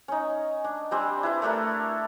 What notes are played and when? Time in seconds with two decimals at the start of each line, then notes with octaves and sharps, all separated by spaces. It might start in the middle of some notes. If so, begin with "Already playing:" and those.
0.08 C#4 D#4
0.64 D4
0.91 G3 C4 D4 G#5
1.23 E4 B4 C6
1.42 A3 D4 A4 A#4